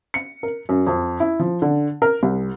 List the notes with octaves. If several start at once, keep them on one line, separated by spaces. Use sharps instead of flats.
C#7
A#4
F#2
F2
E4
F3
D3
A#4
C2